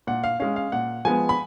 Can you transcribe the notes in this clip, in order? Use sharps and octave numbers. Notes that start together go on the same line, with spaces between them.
A#2 F#5
F5
G#3 C#4 F5
F5
A#2 F#5
F3 G#3 B3 G#5
B5